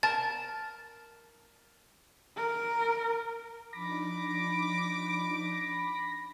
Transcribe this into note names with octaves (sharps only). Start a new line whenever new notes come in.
A#4 A5 A6
A#4
F3 D4 D#4 B5 D6 A#6